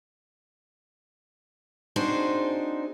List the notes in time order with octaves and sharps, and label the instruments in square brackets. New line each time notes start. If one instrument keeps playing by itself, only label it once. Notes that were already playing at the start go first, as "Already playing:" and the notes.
[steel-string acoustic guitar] C4 D4 D#4 F#4 G#4 C5